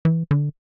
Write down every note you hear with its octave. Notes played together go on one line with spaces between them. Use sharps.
E3
D3